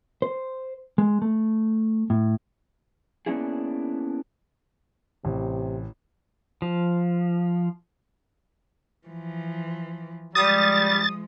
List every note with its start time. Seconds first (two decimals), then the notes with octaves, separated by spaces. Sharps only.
0.22 C5
0.98 G#3
1.22 A3
2.10 A2
3.26 A#3 B3 C#4 D4 E4 G#4
5.25 A1 C3
6.62 F3
9.07 E3 F3
10.35 F3 G3 G#3 D#6 A6